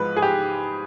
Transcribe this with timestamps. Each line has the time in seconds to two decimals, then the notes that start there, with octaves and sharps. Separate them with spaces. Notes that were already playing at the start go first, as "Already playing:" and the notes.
Already playing: G#2 F3 G#3 B4
0.16 G#4
0.22 G4